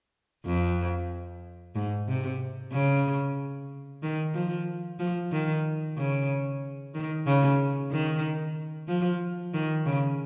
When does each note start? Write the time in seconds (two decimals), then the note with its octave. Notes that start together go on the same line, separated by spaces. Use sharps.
0.46 F2
1.75 G#2
2.08 C3
2.73 C#3
4.03 D#3
4.34 F3
4.99 F3
5.32 D#3
5.97 C#3
6.94 D#3
7.27 C#3
7.91 D#3
8.88 F3
9.53 D#3
9.86 C#3